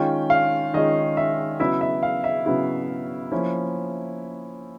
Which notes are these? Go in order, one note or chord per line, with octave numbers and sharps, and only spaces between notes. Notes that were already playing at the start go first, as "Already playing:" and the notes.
Already playing: D#3 G#3 C#4 F4 G5
F5
D#3 G#3 C#4 F4 D#5
E5
C#3 F#3 B3 E4 E5
E5
F5
E5
C#3 F#3 B3 E4
F3 A#3 C#4 E4